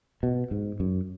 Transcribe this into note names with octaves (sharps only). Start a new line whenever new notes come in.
B2
G#2
F#2